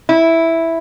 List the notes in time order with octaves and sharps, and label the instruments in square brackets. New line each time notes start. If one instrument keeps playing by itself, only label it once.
[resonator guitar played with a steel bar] E4